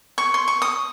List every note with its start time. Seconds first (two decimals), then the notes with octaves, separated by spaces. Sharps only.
0.18 C#6
0.34 C6
0.48 C#6
0.62 D#6